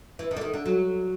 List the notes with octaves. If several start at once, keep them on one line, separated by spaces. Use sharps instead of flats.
E3
D#3
D3
D#3
D3
F#3